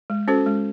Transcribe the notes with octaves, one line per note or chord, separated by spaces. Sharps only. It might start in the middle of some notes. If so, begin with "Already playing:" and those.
G#3
C#4 F#4 A4 C5
G#3